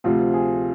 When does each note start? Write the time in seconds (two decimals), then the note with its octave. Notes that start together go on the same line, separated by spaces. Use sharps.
0.04 D2 C3 F3 F4
0.34 G#4